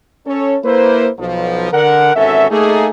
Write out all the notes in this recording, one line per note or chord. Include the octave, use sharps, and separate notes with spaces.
C#4 A4 C#5
A#3 E4 B4 C5
B1 F3
D3 A#4 F#5
G#1 E2 C#4 F#4 A4 E5
A3 A#3 D#4 G#4